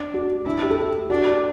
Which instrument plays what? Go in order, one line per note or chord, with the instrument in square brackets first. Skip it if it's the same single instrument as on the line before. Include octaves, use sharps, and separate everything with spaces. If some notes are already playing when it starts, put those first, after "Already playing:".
Already playing: [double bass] D4
[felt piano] F#4
[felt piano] D4 [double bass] E4
[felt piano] G4
A4
G4
[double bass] D4 [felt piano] F#4